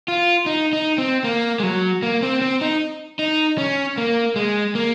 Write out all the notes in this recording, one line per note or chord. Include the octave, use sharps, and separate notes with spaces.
F4
D#4
D#4
C4
A#3
G#3
F#3
A#3
C4
C4
D#4
D#4
C#4
A#3
G#3
A#3